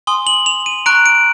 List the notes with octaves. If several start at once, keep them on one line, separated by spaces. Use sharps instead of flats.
G#5 C6 D#6 G7
F#7
F7
D#7
A#5 C#6 F#6 D7
D7